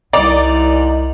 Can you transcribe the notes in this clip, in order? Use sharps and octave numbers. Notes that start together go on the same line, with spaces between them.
C2 D#4 D5